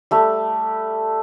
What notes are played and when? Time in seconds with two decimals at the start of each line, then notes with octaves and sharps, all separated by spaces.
0.11 G3 A3 G4